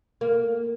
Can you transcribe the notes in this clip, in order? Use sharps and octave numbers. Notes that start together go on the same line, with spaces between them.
A#3